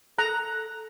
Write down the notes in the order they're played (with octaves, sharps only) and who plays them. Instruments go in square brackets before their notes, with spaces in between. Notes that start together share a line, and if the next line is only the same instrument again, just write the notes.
[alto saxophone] A4 [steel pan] A#5 [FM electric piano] F#6